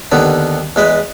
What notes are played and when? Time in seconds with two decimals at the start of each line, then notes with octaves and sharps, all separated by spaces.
0.12 D#2 D3 B3
0.76 E2 G#3 B4